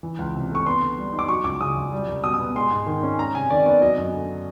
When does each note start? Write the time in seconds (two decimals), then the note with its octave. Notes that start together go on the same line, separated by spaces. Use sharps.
0.03 E3
0.19 C#2
0.35 C3
0.51 A3 C#6
0.66 B3 C6
0.82 D3
0.98 G3
1.13 D#4
1.19 D6
1.28 F#3 C#6
1.44 C#2 D6
1.60 C#3 D#6
1.77 C#2
1.92 G3
2.08 C2
2.24 B2 D#6
2.34 D#6
2.39 B3
2.56 G#3 C6
2.71 G#2
2.87 D#3
3.03 C#4
3.18 G#3 A#5
3.35 C3 G#5
3.50 D#3 D5
3.66 B3 D5
3.81 F#3 D#5
3.98 F#2
4.14 D3